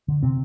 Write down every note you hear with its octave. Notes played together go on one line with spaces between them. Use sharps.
D3
C3 C4